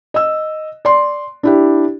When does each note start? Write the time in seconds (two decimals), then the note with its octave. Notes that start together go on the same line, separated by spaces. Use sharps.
0.14 D#5 E6
0.85 D5 C6
1.43 D4 E4 G4